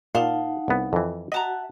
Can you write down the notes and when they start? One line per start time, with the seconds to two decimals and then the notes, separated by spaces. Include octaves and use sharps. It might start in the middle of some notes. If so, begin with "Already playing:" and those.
0.15 A#2 D#4 F5 F#5 A5
0.68 C2 B3
0.93 F2 E3
1.32 F#4 D#5 E5 F#5 A5 A#5